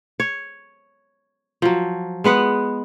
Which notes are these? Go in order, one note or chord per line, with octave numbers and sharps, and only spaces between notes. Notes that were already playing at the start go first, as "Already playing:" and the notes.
C#5
F3 F#3
G#3 B3 B4 F#5